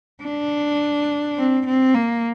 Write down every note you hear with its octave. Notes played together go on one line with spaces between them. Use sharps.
D4
C4
C4
A#3